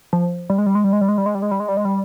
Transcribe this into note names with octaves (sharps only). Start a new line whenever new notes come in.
F3
G3
G#3
G3
G#3
G3
G#3
G3
G#3
G3
G#3
G3
G#3
G3
G#3
G3
G#3
G3